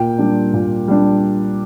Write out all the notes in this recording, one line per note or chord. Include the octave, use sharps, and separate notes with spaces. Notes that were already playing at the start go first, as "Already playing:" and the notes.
Already playing: A#2 G5
G3 D4
A#2
G3 D4